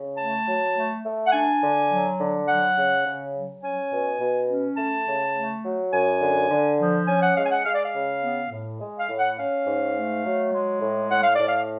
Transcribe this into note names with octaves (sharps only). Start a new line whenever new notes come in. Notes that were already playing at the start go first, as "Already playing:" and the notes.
Already playing: C#3
A3 A5
F#3
A3
A3
F#5
D4 G#5
D3
F#3
D3
F#3 F#5
C#3
C#3
F#3
C#4 G#5
B2
B2
C#4
A3 A5
C#3
A3
F#3
F#2 G#5
D3
D3
F3
C#4 G#5
F#5
G#3 F5
G#5
F#5
G#3 F5
D5
F5
C#3
B3
A2
G#3
F5
A2
F#5
C#4 F5
G#2
A3
F#3
G#3
A2
A2 F#5
F5
A2 D5
F5